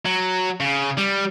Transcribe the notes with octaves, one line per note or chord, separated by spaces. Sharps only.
F#3
C#3
G3